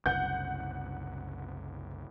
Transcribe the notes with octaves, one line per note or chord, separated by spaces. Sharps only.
F#1 C2 F#5 G6